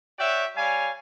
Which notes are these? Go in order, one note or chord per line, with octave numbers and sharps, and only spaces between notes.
F#4 C#5 D5 E5 G5
G3 C#5 F5 G#5